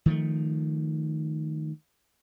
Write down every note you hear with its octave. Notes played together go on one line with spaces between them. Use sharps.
D#3 F3 A3